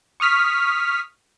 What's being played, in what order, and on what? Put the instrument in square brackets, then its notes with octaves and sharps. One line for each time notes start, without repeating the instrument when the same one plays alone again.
[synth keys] C#6 D#6 F6 B6